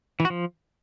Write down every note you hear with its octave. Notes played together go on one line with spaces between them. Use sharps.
E3
F#4
F3